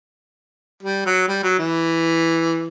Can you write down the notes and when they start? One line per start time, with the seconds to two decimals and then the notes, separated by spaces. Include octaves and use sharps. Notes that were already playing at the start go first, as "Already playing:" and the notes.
0.83 G3
1.05 F#3
1.28 G3
1.43 F#3
1.58 E3